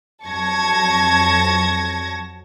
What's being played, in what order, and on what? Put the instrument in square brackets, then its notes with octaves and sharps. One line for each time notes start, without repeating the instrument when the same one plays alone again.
[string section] F2 F#3 A5 C#6 G#6 A#6